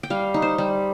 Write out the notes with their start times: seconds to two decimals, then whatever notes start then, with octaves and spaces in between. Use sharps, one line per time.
0.03 G5
0.10 G3 F5
0.34 D#4
0.42 C5
0.58 G3